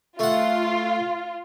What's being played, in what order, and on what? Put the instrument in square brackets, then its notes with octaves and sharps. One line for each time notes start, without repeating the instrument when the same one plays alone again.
[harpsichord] A3 F#5 [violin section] F4